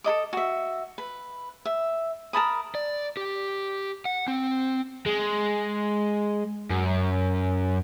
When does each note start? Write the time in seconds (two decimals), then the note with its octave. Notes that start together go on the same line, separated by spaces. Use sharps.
0.04 A4 A#4 D#5 D6
0.33 F#4 E5
0.98 B4
1.65 E5
2.33 A#4 A5 B5 D#6
2.75 D5
3.17 G4
4.05 F#5
4.28 C4
5.06 G#3
6.71 F#2